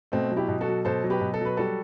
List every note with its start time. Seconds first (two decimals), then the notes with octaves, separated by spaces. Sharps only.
0.12 B2 A3 C4
0.31 F#3
0.36 E4 G4
0.48 B2
0.61 F#4 A4
0.68 F#3
0.85 B2 A4 C5
1.04 F#3
1.10 G4 B4
1.21 B2
1.34 A4
1.41 F#3 B4
1.57 G3 F#4 A4